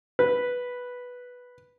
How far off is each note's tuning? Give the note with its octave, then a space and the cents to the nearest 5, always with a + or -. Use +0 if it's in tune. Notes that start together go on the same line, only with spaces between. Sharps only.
B4 -5